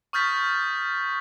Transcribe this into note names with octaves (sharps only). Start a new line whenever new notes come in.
C#6 D#6 F6 G6 A6 B6